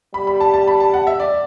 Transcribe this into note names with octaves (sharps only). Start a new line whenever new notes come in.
G3 B5
B5
A5
A5
B5
A5
F#5
E5
D5